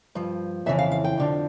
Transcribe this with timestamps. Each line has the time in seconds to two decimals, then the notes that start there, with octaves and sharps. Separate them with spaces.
0.15 G2 F3
0.66 F2 C#3 E3 E5
0.79 F5
0.92 F5
1.04 G5
1.17 F2 D3 F3